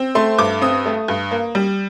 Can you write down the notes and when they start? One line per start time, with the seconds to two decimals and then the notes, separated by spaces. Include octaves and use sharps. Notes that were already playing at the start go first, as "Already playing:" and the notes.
Already playing: C4
0.15 A3 C6
0.38 G2 D6
0.62 C4 D#6
0.86 A3
1.08 G2
1.31 A#3
1.55 G3